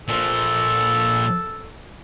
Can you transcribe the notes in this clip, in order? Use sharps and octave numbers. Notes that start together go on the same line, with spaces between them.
A#2 F3 A4